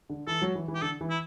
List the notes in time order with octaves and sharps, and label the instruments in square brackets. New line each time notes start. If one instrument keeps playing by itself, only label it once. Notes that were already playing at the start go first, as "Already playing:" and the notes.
[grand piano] D3
[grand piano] E3 [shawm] A4
[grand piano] F#3
E3
E3
[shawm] G4
[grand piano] D3 [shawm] A4
[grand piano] E3
[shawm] E4